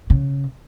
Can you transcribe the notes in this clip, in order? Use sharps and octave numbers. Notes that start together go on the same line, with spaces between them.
C#3